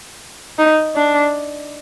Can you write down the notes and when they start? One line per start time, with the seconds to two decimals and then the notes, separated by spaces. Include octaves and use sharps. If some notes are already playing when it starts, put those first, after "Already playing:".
0.58 D#4
0.96 D4